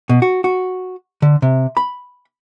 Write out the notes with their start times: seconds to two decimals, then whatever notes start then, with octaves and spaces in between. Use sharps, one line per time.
0.09 B2
0.22 F#4
0.44 F#4
1.22 D3
1.42 C3
1.77 B5